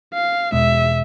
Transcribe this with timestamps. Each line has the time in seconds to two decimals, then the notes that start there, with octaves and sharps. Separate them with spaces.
0.13 F5
0.52 E2 B2 G#3 E5